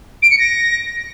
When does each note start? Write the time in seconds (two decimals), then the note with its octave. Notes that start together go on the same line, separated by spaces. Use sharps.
0.22 D7
0.31 C#7
0.39 A#6